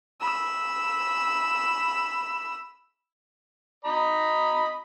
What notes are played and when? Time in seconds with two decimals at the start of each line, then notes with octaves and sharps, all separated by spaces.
0.21 B5 E6
3.85 D#5 A#5 B5